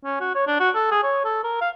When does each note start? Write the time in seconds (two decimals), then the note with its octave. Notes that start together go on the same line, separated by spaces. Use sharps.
0.05 C#4
0.21 F#4
0.35 C#5
0.47 D4
0.60 F#4
0.75 A4
0.91 G#4
1.04 C#5
1.25 A4
1.44 A#4
1.62 F5